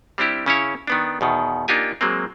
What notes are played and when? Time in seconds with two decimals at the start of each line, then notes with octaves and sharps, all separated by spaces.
0.18 G3 C4 D4 E4 G4
0.46 C#3 C#4 E4 C#5
0.87 D#3 B3 D4
1.21 E2 B2 D#3
1.68 A#3 D4 D#4 F4 G4 G#5
2.01 F#3 G#3 A#3 C4